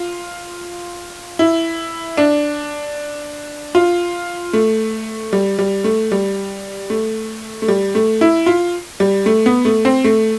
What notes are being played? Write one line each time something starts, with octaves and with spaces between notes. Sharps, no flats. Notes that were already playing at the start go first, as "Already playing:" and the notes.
Already playing: F4
E4
D4
F4
A3
G3
G3
A3
G3
A3
A3
G3
A3
E4
F4
G3
A3
B3
A3
C4
A3